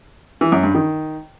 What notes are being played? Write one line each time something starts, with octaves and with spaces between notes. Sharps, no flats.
E3
F#2
G2
D#3